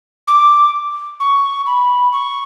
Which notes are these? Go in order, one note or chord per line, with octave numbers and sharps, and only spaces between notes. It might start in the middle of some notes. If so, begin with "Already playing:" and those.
D6
C#6
B5
C#6